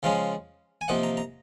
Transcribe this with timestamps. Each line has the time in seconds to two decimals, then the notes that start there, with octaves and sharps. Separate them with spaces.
0.03 C#3 F3 G#3 C#4 F5
0.81 G#5
0.88 C3 F3 A#3 D#4 F#5
1.03 A#5
1.17 A#5